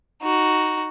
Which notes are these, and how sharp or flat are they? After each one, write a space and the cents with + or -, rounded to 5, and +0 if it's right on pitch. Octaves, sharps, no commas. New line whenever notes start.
D#4 +0 F#4 +5